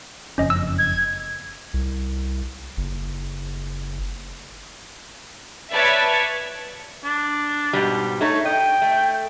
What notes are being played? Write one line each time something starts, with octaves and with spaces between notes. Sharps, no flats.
F#1 F2 C#4 D#5
E6
G#6
C2
F#1
B4 C#5 D5 E5 A5
D4
G#2 B2 G3
A3 D#4 A4 C#5
D#5 G5
A3